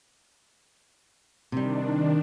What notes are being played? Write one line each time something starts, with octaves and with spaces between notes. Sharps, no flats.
C3 D#3 G3 D4